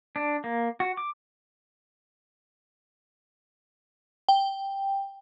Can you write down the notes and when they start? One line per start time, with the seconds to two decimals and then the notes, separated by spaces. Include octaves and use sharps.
0.16 D4
0.44 A#3
0.80 F#4
0.97 D6
4.29 G5